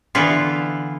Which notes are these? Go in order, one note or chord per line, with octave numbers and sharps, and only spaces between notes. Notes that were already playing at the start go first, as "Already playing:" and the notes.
D3 E3 B3 E4 F4